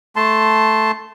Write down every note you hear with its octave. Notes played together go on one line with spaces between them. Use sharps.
A3 A5 C6